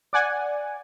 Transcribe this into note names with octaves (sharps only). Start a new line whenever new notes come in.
D5 F#5 G#5